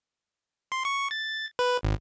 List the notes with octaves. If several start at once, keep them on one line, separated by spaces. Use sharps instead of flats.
C6
C#6
A6
B4
G#1